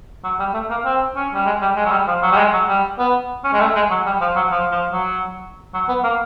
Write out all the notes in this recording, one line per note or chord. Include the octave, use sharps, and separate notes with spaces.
F#3
G3
A3
A#3
C4
C#4
G3
G#3
G3
G#3
F#3
G3
F3
F#3
G3
G#3
F#3
G3
B3
C#4
G#3
A3
G#3
F#3
G3
F3
F#3
F3
F3
F#3
F#3
B3
A#3